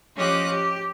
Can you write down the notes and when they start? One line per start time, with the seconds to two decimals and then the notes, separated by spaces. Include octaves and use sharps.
0.16 F3 C#4 G4 D#5 D6 F#6
0.48 G4